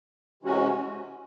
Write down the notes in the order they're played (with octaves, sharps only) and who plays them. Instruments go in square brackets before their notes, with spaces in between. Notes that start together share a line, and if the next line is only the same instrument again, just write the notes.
[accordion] C3 E3 G#3 C#4 F#4